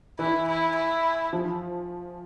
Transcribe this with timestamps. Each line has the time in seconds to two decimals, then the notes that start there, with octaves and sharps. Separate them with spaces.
0.19 E3 E4
0.48 E4
0.75 E4
1.33 F3